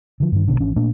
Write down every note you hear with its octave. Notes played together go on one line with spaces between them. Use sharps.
D3 F3
G2 D#3
B1 B2 D3
G#1 E3 C#4 D4
A#2 A3 A#3 D4